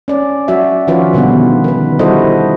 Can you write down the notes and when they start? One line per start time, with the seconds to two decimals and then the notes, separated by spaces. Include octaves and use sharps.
0.08 C#4 D5
0.48 F#3 F#4 D5 E5
0.87 D#3 F3 C#4 F4 F#4 B4
1.13 B2 D3 D#3 G3 B3
1.64 D#3 B4
1.99 G3 E4 F#4 A4 C5 D#5